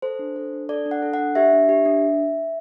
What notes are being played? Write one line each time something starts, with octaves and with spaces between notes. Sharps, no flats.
A4 C5
D4
A4
D4
A4 D5
D4
F#5
A4
F#5
D4
G4 E5
D4
G4
D4